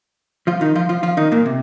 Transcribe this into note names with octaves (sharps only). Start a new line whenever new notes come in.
F3 F4
D#3 D#4
F3 F4
F3 F4
F3 F4
D#3 D#4
A#2 A#3
C3